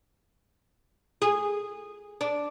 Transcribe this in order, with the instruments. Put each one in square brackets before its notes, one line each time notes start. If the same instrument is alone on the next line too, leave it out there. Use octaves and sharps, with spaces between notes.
[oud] G#4
D4